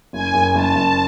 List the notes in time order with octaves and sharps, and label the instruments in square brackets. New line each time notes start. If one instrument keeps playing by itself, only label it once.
[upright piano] F#1 [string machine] G#5
[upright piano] F#1
[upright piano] F#1 [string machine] A5
[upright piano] F#1